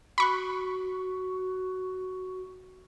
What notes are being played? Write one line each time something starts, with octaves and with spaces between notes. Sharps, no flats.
F#4 B5 C#6 F#6